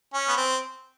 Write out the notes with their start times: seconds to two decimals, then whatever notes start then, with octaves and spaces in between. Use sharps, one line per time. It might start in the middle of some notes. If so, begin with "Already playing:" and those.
0.14 C#4
0.28 B3
0.37 C4